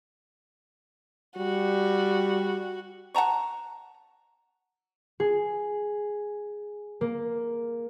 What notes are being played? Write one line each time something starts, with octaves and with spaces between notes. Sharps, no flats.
G3 F#4
F#5 A5 A#5 C#6
G#4
A#3